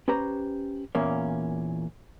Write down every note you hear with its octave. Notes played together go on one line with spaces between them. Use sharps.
C#4 G4 B4 C5 A#5
E2 A#2 A#3 C#4